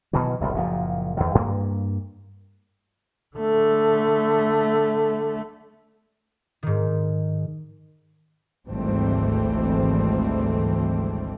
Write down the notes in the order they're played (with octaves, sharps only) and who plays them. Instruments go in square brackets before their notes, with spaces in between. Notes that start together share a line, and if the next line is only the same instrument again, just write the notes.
[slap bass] B2 D#3 E3 F#3
F#1 C2 A#2
F#1 A#2 F3
E2 D#3
G2 A#3
[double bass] D3 A3
[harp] G#2 D#3
[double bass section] G#1 D2 E3 G3 A3 C4